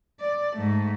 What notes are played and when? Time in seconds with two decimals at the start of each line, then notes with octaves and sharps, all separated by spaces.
0.21 D5
0.57 G#2 A3